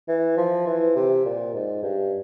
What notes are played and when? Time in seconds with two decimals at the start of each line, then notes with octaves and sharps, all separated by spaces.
0.08 E3
0.37 F3
0.67 E3
0.96 C3
1.25 A#2
1.54 G#2
1.83 G2